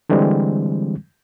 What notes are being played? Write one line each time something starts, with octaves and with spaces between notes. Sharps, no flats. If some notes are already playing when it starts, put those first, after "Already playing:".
D3 E3 G3 G#3 C4